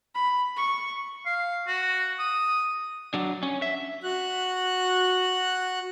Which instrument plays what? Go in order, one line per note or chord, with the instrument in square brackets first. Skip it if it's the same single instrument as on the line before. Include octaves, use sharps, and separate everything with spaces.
[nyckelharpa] B5
C#6
[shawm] F5
F#4
D#6
[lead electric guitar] F#3 D4
C#4
E5
[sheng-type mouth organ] F#4 F#6